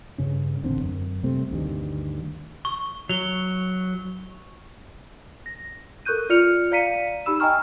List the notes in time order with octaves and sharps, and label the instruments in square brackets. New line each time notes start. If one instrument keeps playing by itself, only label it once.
[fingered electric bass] G2 C#3 C#4
D#1 A1 D3 C4
F#2
C3 G3 A3 C4
D2 G2 D#3
[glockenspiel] C#6
[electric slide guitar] F#3 [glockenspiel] F7 G7
[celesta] A#6
A4 A#4 C#6 F#6 G6 D#7
F4 D5 F6 C#7 F7
D5 F5 A#5 B6 C#7 D#7
D#4 G4 B5 E6 E7
D#5 G5 G#5 A#5 C#6 F6